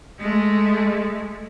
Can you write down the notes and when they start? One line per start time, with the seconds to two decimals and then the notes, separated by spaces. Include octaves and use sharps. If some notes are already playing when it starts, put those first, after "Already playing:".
0.20 G#3 A3